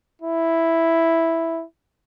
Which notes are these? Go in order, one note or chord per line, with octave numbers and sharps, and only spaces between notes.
E4